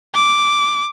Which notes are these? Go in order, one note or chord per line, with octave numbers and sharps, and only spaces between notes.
D6